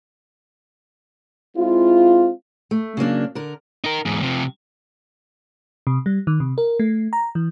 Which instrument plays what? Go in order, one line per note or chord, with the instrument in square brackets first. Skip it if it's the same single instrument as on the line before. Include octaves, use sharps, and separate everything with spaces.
[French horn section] G#3 C4 E4 F4
[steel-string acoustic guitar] A3
C#3 F#3 A#3 D4
D3 A#4
[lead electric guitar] D#4 A#4
E2 G#2
C3 F3
[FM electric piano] C3
G3
D#3
C3
A#4
A3
A#5
E3